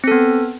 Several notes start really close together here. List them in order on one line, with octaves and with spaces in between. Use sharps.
C4 A4 B3